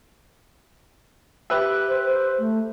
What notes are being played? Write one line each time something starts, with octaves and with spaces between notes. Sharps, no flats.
G4 B4 E5
C5
C5
A3